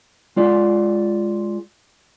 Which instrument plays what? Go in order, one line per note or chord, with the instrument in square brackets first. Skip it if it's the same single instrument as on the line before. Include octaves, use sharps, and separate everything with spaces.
[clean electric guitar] G#3 F4 D5